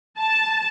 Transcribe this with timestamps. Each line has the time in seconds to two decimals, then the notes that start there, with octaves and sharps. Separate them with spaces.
0.19 A5